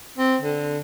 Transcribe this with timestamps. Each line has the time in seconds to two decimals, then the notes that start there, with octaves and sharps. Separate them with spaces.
0.18 C4
0.42 D3